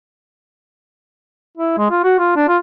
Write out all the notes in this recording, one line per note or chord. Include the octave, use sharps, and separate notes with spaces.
E4
G#3
F4
F#4
F4
D4
F4